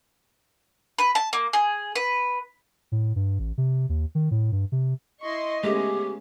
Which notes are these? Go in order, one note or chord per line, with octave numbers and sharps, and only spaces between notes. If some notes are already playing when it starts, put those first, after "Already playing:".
B4
A5
A#3
G#4
B4
A2
G2
A1
C3
D#2
D#3
A2
G2
C3
E4 D#5 C6 C#6
G#3 A3 B3 C#4 G4 G#4